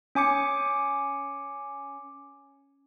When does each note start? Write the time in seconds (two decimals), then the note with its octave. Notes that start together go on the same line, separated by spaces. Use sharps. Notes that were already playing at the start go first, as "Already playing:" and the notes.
0.15 C#4 G#5 D6 C#7